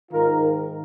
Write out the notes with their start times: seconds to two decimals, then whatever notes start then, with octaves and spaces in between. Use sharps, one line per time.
0.11 G#2 D#3 F4 A#4